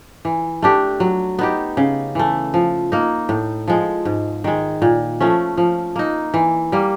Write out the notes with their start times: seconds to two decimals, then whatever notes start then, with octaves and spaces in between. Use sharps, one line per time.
0.25 E3
0.62 A3 D4 G4
1.00 F#3
1.39 B3 D#4 G4
1.77 C#3
2.15 E3 A3
2.54 F3
2.92 A#3 D#4
3.29 A2
3.68 F3 G#3
4.05 G#2
4.44 D#3 G#3
4.82 A#2
5.21 F3 A3 C#4
5.57 F3
5.96 A#3 D#4
6.34 E3
6.72 G3 A#3